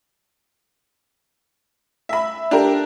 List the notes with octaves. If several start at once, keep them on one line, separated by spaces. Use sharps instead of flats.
E5 B5
D4 G4 A#4